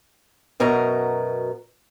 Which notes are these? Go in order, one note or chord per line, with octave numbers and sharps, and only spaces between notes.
F#2 B2 A#4 A#5